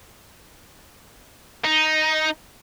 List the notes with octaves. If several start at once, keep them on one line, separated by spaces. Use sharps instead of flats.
D#4